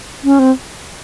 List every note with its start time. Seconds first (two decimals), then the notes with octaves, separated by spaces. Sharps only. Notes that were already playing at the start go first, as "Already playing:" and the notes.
0.24 C#4
0.39 C4